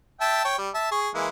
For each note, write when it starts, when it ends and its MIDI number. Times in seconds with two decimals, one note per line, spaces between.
0.21 0.44 76
0.21 0.44 79
0.21 0.44 81
0.45 0.56 73
0.45 0.56 79
0.58 0.69 55
0.74 0.89 76
0.74 0.89 81
0.91 1.09 68
0.91 1.09 85
1.15 1.28 52
1.15 1.28 56
1.15 1.28 58